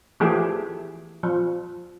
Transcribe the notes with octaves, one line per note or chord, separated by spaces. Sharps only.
E3 F3 A3 G4 G#4
F3